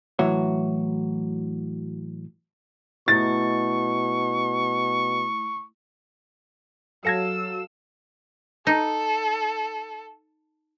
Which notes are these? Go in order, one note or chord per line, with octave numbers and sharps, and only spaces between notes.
A2 E3 F#3 F#4 C#5
B2 A3 E4 C#6 A6
F#3 A4 F5 A5 E6 G#6 A#6 C#7
D#4 A4